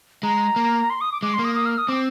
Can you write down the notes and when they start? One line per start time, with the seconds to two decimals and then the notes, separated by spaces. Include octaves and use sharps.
0.23 G#3 A#5
0.56 A#3
0.90 C6
1.01 D#6
1.12 D6
1.22 G#3 D6
1.34 C6
1.39 A#3
1.44 D#6
1.55 D#6
1.66 F6
1.78 D#6
1.88 C4 D6